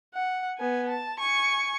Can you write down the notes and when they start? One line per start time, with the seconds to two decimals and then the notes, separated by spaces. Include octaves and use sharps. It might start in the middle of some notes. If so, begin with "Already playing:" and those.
0.14 F#5
0.58 B3 G#5
0.89 A5
1.19 G#5 C#6